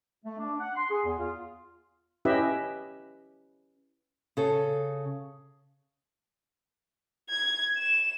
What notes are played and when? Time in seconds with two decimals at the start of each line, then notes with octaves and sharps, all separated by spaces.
0.24 A3
0.39 D4
0.60 F#5
0.76 C6
0.90 G#4
1.05 E2
1.18 F4
2.25 C#4 E4 G4 B4 D#5 E5
4.37 C#3 A4
7.29 G#6
7.78 E7